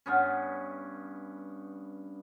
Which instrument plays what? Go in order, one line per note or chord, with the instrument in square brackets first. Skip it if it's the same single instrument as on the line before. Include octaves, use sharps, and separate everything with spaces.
[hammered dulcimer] G2 B3 C#4